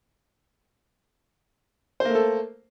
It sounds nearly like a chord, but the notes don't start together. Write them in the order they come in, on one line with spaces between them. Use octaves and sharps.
C5 A#3 A3 A4